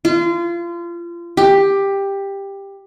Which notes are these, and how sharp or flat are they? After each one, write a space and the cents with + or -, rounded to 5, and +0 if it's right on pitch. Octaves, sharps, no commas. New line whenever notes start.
F4 -30
G4 +10